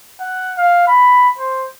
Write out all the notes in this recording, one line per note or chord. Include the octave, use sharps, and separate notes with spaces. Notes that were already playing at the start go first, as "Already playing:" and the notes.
F#5
F5
B5
C5